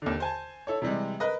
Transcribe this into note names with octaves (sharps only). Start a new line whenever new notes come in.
D#2 D3
C5 G#5 A5
E4 A4 C#5
C3 E3 G3 G#3
A#4 B4 D#5